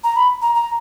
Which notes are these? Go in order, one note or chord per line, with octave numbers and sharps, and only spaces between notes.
A#5
B5
A#5
A#5